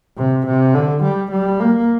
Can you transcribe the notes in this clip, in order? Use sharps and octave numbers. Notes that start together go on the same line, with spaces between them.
C3
C3
D3
G3
G3
A#3